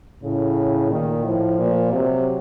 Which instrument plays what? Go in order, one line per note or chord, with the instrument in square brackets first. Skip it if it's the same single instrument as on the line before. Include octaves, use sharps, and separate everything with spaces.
[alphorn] A2 [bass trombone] C#3
[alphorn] A#2 [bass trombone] D#3
[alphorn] A2 [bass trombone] F3
[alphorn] A#2
[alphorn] C3 [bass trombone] F#3